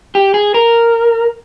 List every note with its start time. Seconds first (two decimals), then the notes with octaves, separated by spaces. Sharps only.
0.15 G4
0.34 G#4
0.54 A#4